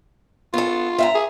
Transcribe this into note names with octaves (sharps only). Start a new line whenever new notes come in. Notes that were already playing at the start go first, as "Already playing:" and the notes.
B3 F4 A4
E5 F5 A#5
G#4